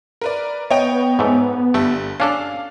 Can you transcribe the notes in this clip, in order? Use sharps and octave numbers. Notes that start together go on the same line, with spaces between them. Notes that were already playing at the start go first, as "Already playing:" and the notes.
A#4 B4 D5
B3 C#5 D#5 G5
G#2 A3
G1 G3 A3
C#4 D4 A4 F5